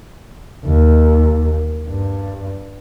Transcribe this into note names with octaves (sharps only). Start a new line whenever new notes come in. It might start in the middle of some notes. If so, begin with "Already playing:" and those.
D#2
G2